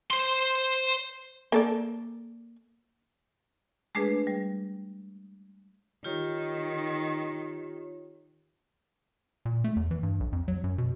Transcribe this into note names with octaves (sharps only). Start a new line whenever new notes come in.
C5 C6
A#3 A4 D5
G#3 A3 D4 G#4 B4
G3
D#3 F4 G4 C#5
A#2
A3
E2
E3
G2
B1
F2
F#3
F#2
B2